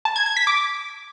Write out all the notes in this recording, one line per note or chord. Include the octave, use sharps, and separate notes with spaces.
A5
G#6
G#6
B6
D6